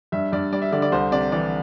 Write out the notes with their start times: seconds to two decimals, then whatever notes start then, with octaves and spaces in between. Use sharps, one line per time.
0.12 G2 E5
0.32 G2 D5
0.52 G3 D5
0.62 E5
0.72 D3 D5
0.82 D5
0.92 C2 C5
1.12 C3 D5
1.32 E3 D5